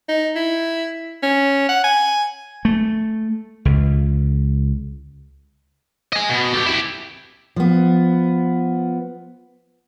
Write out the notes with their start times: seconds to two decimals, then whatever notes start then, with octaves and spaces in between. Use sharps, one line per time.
0.09 D#4
0.36 E4
1.23 C#4
1.69 F#5
1.84 G#5
2.65 A3
3.65 C#2
6.13 D#5 G#5
6.30 B2
6.54 G4 A4
6.67 E4 G4
7.56 F3 B3